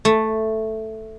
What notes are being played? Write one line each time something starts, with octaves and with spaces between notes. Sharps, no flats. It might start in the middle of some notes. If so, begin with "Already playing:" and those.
A3